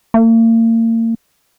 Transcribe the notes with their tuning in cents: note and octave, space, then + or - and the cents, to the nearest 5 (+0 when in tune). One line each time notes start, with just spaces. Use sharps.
A#3 -40